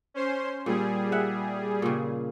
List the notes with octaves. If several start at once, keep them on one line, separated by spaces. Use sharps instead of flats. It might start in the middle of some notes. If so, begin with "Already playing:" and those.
C#4 C5 C6
A#2 G3 G#4
E5 F#5
A#2 C#3